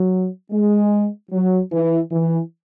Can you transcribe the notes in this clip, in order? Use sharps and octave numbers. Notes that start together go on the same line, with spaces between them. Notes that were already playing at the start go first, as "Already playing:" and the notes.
Already playing: F#3
G#3
F#3
E3
E3